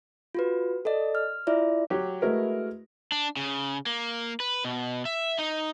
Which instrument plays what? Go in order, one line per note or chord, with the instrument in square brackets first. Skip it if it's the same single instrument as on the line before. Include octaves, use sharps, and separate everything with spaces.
[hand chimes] F4 F#4 B4
A4 D5 D#5
F6
E4 F4 D5 E5
[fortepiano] F#3 G4
[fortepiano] G#3 E4 A#4 [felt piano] A3 F#4 B4
[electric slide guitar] D4
C#3
A#3
B4
B2
E5
D#4